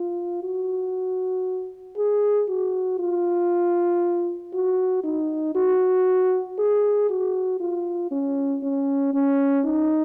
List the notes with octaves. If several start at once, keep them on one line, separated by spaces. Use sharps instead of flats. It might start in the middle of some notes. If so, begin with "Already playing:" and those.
Already playing: F4
F#4
G#4
F#4
F4
F#4
D#4
F#4
G#4
F#4
F4
C#4
C#4
C#4
D#4